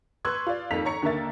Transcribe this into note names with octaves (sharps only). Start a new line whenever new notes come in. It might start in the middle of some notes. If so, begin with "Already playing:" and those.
B4 C6 C#6 E6 F#6 G#6
F4 D5
F2 D#3 A#3 B6 F7
C#5 A#5 C#6 C#7
D#2 D3 D4 A#4 E5 A6